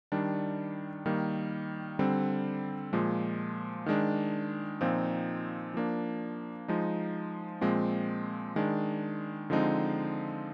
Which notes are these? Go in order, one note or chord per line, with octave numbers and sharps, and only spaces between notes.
D#3 G3 D4
D#3 G3 A#3
D3 G3 C4
A#2 F3 G#3
D#3 G#3 D4
A#2 F3 C4 D#4
F3 A#3 D4
F3 G#3 D#4
A#2 F3 G#3 C4
D#3 G#3 D4
D3 F3 G#3 C4 D#4